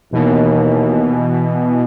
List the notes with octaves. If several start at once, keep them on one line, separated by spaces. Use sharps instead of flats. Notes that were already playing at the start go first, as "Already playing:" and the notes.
D#2 B2 E3